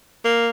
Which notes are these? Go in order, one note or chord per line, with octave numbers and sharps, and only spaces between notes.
A#3